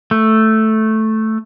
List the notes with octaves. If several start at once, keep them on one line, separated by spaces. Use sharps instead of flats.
A3